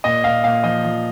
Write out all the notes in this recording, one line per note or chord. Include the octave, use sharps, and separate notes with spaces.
A#2 D#5
A#2 F5
A#2 F5
F3 D#5
F3